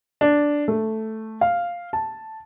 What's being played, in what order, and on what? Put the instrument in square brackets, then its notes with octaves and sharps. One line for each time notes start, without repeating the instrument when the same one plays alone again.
[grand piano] D4
A3
F5
A5